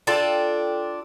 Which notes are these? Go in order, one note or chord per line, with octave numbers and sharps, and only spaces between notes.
D4 F4 A4 G5